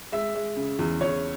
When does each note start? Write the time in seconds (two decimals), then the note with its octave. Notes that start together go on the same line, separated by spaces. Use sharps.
0.12 G#3 E5
0.35 G#3
0.56 C#3
0.79 E2
1.01 E2 C#5